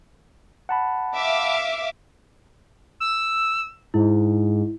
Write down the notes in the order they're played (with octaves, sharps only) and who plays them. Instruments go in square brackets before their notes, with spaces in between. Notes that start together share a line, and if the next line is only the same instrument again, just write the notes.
[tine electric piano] F#5 A5 B5
[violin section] E5 F5 D6
[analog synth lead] E6
[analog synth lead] G#2 [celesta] E4